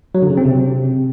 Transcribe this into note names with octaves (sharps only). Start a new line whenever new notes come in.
F#3
D3
C#3
C4
C3